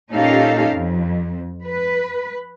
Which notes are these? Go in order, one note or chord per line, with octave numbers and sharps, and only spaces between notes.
A#2 C#4 D#4 G4 A4 F5
F2
B4